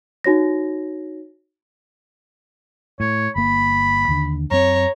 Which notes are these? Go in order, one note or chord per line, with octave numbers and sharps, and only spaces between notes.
D#4 F#4 C#5 A#6
A2 C#5
G1 A#3 B5
D#2 D3
F#2 C4 C#5 A#5